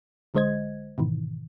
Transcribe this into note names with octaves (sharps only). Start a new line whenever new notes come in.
A#1 D3 G#3 C5 D#5 G#6
G#2 B2 D#3 E3